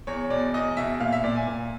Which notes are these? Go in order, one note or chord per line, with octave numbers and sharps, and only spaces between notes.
E2 C#5
B2 D5
E2 D#5
B2 E5
A#2 F5
E5
A#2 D5
G#5
A#2